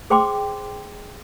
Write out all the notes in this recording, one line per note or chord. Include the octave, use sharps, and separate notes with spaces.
G#4 C5 G5 C6 D6